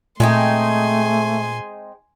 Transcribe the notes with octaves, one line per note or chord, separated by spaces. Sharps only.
A#2 G#3 A3 C4 D#4 G#5 C6